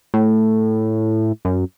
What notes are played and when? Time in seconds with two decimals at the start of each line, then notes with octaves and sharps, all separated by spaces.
0.14 A2
1.45 F#2